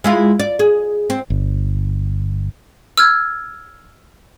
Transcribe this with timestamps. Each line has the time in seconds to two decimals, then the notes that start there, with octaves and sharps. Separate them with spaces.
0.04 G#3 E4 F4
0.39 D5
0.59 G#4
1.10 C4
1.30 G1
2.98 E6 F6 G#6